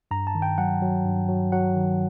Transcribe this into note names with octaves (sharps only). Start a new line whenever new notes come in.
G2 A#5
A5
D#3
G5
F#3 F#5
F#3
G2
F#3
F#3 F#5
D#3